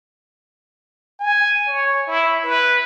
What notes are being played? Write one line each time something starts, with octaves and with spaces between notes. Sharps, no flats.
G#5
C#5
E4
B4